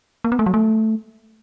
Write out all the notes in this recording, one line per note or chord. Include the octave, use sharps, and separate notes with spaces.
A#3
B3
A3
F#3
A3